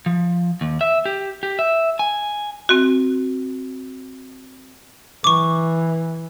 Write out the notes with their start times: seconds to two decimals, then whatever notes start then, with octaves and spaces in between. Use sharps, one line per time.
0.06 F3
0.61 D#2
0.81 E5
1.05 G4
1.43 G4
1.59 E5
1.99 G#5
2.69 C4 F#4
5.24 E3 C#6 D6